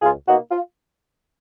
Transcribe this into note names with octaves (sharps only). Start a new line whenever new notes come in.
C#2 F4 G#4
B2 A#3 D#4 F#4
F4